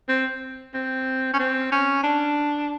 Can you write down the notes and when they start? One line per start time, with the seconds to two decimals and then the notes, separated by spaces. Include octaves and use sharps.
0.08 C4
0.74 C4
1.33 C#4
1.39 C4
1.72 C#4
2.03 D4